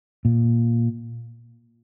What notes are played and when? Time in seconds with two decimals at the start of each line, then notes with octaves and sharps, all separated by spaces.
0.25 A#2